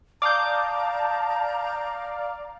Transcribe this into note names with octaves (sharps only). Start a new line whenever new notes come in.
D5 F5 A5 A#5 D6 D#6 G6